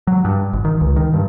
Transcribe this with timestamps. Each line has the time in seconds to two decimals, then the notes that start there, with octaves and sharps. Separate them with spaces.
0.07 F#3
0.25 G2
0.53 G#1
0.65 D#3
0.81 C#2
0.96 D#3
1.14 G2